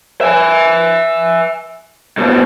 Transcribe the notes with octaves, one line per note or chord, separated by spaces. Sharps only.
E5 G#5
G#2 B2